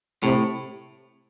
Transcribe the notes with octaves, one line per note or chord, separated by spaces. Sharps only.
A2 C3